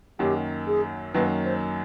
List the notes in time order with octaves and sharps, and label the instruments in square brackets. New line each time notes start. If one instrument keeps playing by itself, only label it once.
[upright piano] F#2 D#3 F#3 A#3 [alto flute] G4
[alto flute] G#4
[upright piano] F#2 D#3 F#3 A#3 [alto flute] B4
[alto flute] C5